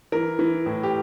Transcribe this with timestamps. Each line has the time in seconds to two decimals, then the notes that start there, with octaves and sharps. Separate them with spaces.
0.12 E3 A#4
0.39 E3
0.66 A2
0.83 G4